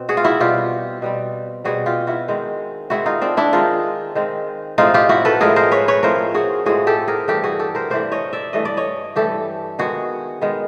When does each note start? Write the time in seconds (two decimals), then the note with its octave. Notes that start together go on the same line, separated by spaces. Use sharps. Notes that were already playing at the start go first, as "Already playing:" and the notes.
Already playing: B2 C4
0.09 F#4 G#4
0.17 F4
0.24 E4 F#4
0.40 B2 G3 C4 F4 G4
1.02 B2 G3 C4
1.65 B2 G3 C4 F#4 G#4
1.86 F4 G4
2.07 E4 F#4
2.28 D#3 G#3 C4
2.90 D#3 G#3 C4 E4 F#4
3.06 D#4 F4
3.21 C4 D4
3.37 D4 E4
3.53 D#3 G#3 C4 D#4 F4
4.15 D#3 G#3 C4
4.78 A2 F3 G#3 C4 D#4 F4
4.94 F4 G4
5.09 E4 F#4
5.25 A4 B4
5.40 A2 F3 G#3 C4 G#4 A#4
5.56 A#4 C5
5.71 B4 C#5
5.88 B4 C#5
6.03 A2 F3 G#3 C4 A#4 C5
6.34 F#4 G#4
6.66 A2 F3 G#3 C4 F#4 G#4
6.87 G4 A4
7.08 G#4 A#4
7.28 G2 E3 A3 G4 A4
7.44 F#4 G#4
7.59 G4 A4
7.75 A#4 C5
7.90 G2 E3 A3 C5 D5
8.12 C#5 D#5
8.33 D5 E5
8.53 G2 E3 A3 D#5
8.65 D5
8.77 C#5 D#5
9.16 G2 E3 A3 G4 A4
9.79 D#3 G#3 B3 F#4 G#4
10.41 D#3 G#3 B3